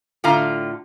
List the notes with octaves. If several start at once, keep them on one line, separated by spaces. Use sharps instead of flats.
A2 D3 F4 A#5